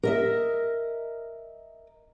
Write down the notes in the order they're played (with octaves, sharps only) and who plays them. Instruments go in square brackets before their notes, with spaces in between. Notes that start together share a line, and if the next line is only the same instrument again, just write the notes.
[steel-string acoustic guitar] A#4 D#5 E5